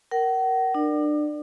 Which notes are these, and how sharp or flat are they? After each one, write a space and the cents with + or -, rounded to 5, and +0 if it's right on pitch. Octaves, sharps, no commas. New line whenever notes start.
A#4 +0 F#5 +40
D4 +35 D5 +15